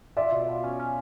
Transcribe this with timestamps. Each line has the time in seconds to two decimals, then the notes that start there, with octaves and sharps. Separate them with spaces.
0.17 F4 D5 E5
0.32 B2
0.48 B2
0.64 C#4
0.79 C#4